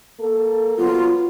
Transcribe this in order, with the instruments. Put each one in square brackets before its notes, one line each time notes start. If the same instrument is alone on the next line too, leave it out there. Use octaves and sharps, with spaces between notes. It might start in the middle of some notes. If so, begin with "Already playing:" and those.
[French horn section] A#3 A4
[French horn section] F#3 B3 [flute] F4